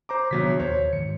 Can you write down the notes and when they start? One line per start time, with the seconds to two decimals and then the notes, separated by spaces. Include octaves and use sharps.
0.09 C5 A#5 D6
0.31 A#1 C3 D#3 F#3 B3 B6
0.60 D#2 C5 C#5
0.93 G#2 D#3 C#7